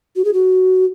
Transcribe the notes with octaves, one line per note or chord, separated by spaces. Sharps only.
F#4
G#4
F#4